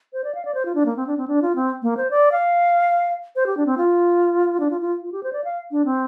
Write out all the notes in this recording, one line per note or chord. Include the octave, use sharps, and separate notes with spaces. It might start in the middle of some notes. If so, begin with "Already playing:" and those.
C5
D5
F5
D5
C5
F4
D4
A#3
C4
D4
C4
D4
F4
C4
A#3
C5
D5
F5
C5
G4
D4
C4
F4
D4
F4
F4
F4
G4
C5
D5
F5
D4
C4